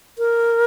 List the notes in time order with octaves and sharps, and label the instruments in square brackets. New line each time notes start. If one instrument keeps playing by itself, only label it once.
[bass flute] A#4